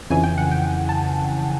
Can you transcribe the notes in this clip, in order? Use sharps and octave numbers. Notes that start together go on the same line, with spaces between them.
F2 C#3 E3 G#5
G5
F#5
G5
A5